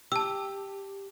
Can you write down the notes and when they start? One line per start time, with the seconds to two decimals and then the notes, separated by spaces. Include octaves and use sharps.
0.12 G4 A5 E6